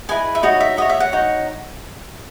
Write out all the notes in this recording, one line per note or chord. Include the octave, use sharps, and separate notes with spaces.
E4 G#4 B4 D#5 G#5
E5
D#4 F#4 C#5 D#5
E5
F#4 C#5 D#5
E5
F#5
D#4 F#4 C#5